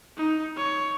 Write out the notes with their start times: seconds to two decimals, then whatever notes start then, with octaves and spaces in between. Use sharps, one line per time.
0.17 D#4
0.57 C#5